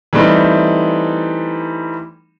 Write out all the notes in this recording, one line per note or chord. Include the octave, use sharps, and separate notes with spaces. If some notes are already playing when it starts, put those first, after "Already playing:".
E3 G3 A3 C4 D#4